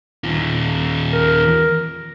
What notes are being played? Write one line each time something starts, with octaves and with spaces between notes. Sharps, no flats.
D#2 F4
A#4